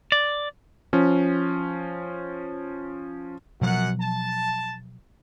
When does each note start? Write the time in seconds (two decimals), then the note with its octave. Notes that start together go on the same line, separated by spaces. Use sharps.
0.12 D5
0.93 F3 C#4
3.61 F#2 B2 F3 F#3 F#5
4.01 A5